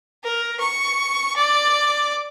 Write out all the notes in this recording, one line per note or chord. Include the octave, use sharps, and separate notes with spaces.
A#4
C#6
D5